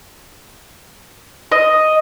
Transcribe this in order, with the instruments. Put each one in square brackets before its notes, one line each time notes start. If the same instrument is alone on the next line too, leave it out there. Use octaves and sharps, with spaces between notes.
[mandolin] D#5